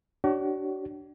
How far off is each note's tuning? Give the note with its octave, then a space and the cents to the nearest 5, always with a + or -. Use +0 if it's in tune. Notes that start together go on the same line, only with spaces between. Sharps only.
D4 +0 F#4 +45 C#5 +0